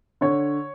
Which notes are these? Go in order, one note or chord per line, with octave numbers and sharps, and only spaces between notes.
D3 C#5